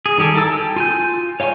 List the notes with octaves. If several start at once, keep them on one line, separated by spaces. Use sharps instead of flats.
G#4
D#3 G3 G4 A4 G#5
E4 A4 A#4 A5 E6
G5
F4 G#5 G6
C#5 F5 G5 G#5 C#6